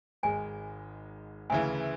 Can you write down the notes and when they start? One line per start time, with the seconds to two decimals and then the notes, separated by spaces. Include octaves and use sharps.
0.23 G#1 G#2 G#3 G#5
1.50 D2 C#3 E3 G#5